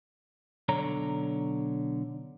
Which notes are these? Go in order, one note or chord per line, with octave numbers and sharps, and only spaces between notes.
B1 D3 C#5 A#5